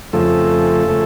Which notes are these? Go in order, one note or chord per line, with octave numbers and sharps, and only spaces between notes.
F2 C#3 F3 A3 A4
C#3 F3 A3